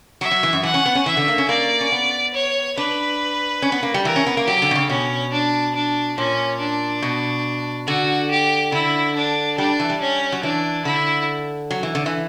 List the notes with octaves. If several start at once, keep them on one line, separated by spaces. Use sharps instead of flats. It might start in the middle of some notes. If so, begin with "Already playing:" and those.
F#3 E5
F#3
E3
F#2
E3 F#5
C#4
B3
C#4
E3 E5
D3
A#3
C#4
A#3 D5
C#4
B3
C#5
D4 B4
C#4
B3
A#3
G3
E3 A#4
C#4
B3
A#3
F#3 G4
D3
B2
C#3
B2 C#4
D4
D4
A#2 C#4
D4
B2
D3 F#4
G4
D3 E4
D4
G3 D4
E3
G3
C#4
F#3
E3 D4
D3 E4
F#3
E3
D3
E3